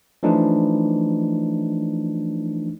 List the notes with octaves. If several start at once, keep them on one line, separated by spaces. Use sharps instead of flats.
E3 F3 A3 D4 D#4